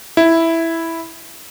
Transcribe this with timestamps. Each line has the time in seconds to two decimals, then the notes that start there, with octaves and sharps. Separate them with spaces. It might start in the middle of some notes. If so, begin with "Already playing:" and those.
0.17 E4